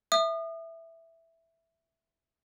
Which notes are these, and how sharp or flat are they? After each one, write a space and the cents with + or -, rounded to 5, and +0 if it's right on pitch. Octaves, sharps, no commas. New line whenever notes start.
E5 +0 D#6 -35